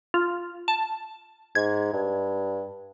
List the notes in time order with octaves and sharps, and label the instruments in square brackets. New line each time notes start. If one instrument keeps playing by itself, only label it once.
[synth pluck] F4
A5
[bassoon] G#2 [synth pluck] G#6
[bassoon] G2